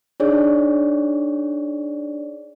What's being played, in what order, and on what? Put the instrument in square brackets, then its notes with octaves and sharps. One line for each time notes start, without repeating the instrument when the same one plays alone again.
[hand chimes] D4 D#4 G#4 C#5 D5